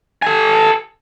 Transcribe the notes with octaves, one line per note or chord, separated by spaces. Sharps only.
A4 G#5